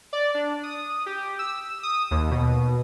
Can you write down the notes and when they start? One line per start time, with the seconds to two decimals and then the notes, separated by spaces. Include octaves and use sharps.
0.13 D5
0.34 D4
0.63 D#6
1.06 G4
1.39 E6
1.83 D#6
2.11 D#2
2.31 B2